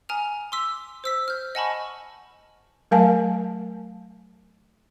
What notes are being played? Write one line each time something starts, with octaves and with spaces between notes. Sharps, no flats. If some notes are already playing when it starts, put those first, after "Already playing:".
G#5 A#5 D#6 F6 F7
C6 D6 E6 B6
C5 E6 B6
F6 G6
D#5 F#5 G#5 A5 B5 C#6
F#3 A3 A#4 F5 G#5 A5